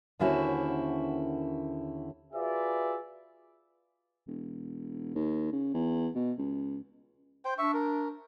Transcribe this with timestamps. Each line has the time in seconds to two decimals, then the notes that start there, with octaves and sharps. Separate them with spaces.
0.19 D#2 D3 C#4 E4 F#4 C5
2.33 F4 F#4 G#4 B4 D5 E5
4.28 E1
5.15 D#2
5.52 C#3
5.74 E2
6.15 B2
6.38 C#2
7.45 C5 G5
7.58 D4 E5 C#6
7.74 A#4